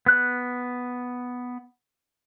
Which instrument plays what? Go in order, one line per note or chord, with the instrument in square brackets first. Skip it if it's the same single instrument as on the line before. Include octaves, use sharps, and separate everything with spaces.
[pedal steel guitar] B3 F#6